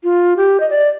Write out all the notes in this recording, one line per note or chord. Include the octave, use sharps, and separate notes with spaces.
F4
G4
D#5
D5